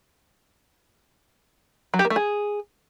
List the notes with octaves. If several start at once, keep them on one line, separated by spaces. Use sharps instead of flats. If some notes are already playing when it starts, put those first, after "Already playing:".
F#3
G4
A#3
A3
G#4